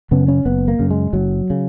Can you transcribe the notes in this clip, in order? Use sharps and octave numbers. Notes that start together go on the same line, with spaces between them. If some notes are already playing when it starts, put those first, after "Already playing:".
F#2 C#3 B3
C#4
F#1 B3
A#3
F#2 C#3
G#3
F#1 F#3
C#3